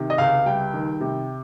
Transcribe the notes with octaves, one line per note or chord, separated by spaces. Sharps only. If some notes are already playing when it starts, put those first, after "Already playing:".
Already playing: C3 D#3
D#5
C#2 F5
G3 G5
D#3
C3